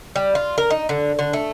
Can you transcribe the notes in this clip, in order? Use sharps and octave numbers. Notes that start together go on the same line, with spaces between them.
G3
F4
A#4
D#4
D3
D3
A3